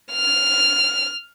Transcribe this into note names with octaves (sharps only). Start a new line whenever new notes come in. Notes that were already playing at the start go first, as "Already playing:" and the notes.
F6